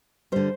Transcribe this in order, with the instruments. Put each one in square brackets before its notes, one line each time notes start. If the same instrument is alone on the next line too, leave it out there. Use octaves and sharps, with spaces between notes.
[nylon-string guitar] D3 G3 C5